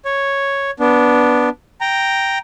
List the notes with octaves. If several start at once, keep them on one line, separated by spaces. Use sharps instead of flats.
C#5
B3 D4
G5 A#5